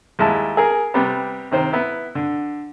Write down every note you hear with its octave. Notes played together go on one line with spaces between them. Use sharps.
D#2 G#3 E4 A5
G#4 A#4
C3 G3 B3
C3 D#3 C5
B3 E4
D3